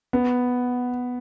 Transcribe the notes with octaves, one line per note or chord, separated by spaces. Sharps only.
B3